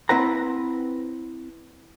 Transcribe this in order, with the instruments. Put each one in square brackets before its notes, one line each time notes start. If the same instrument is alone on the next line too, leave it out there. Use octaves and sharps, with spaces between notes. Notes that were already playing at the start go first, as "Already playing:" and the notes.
[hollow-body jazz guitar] C4 E4 B4 F#5 A#5